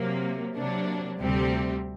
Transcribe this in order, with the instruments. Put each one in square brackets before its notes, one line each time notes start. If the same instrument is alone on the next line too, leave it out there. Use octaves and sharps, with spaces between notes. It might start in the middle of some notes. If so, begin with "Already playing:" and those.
Already playing: [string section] C3 F#3 A#3
C3 F#3 A#3 D4
D2 C3 G3 C4 G4